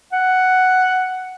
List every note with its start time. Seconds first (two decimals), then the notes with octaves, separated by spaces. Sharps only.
0.13 F#5